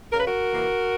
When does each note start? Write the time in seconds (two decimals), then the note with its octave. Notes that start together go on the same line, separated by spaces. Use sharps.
0.12 C#3 A#4
0.19 B4
0.26 F#4 A#4
0.51 E3 A#3